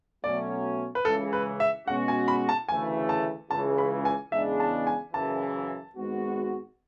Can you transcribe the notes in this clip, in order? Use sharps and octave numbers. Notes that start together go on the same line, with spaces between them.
B2 F#3 A3 C#4 D5
B4
C#2 C#3 E3 A4
B4
E5
B2 G#3 C#4 F#4 F#5
G#5
B5
A5
D2 C#3 E3 A3 G#5
A5
C#2 C#3 E3 A5
B5
G#5
E2 C#3 G#3 D4 E5
A5
G#5
F#1 F#2 C#3 E3 A5
G#1 G#2 G#3 B3 F#4